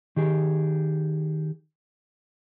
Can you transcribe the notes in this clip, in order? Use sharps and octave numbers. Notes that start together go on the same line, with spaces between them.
D#3 G4 G#4